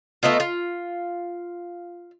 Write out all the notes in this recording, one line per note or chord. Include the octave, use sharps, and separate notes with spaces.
A3 B3 D#4 F4
F4